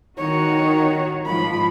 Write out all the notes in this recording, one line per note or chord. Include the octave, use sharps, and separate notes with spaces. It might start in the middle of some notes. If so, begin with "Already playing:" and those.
D#3 D#4 F#4 C#5
G#2 F3 B5